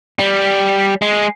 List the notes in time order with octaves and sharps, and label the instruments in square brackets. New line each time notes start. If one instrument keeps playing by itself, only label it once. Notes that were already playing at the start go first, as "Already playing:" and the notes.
[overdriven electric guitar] G3
G#3